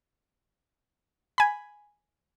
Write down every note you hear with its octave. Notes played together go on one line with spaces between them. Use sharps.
G#5 B5